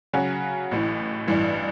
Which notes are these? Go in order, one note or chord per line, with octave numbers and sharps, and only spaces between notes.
C#3 F#3 C#4 F#4
A1 A2 E3
A1 G2 E3